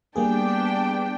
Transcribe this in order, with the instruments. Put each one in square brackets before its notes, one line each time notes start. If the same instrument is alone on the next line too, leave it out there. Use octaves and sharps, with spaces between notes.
[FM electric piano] G3 A#3 G#4 [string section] B3 D4 G5